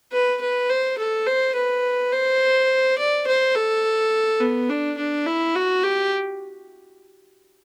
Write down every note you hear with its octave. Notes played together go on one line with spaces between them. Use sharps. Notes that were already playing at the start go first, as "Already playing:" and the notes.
B4
B4
C5
A4
C5
B4
C5
D5
C5
A4
B3
D4
D4
E4
F#4
G4